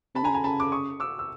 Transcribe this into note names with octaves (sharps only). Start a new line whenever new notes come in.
C3 A5 B5
D3 G#5 A#5
C#3
G#5 A#5
C#3 A5 B5
D6
C#6 D#6
D6 E6
E6